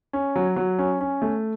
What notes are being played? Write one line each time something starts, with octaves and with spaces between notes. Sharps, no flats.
C#4
F#3
F#3
C#4
C#4
A3